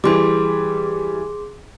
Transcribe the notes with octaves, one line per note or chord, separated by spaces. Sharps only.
E3 G3 G#4 C6 D6